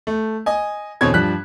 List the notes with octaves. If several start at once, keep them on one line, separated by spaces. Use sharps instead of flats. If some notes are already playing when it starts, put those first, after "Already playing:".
A3
D#5 G#5
E2 B2 D3 C4 C#5 G#6
G2 F3 G3 F#6 B6